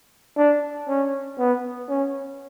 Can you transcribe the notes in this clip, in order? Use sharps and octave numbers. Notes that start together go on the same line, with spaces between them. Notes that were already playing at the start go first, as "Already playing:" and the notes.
D4
C#4
B3
C#4